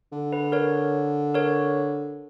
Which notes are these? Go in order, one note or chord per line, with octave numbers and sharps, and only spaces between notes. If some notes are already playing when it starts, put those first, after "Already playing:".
D3
B4
A#4 C#5
A#4 C#5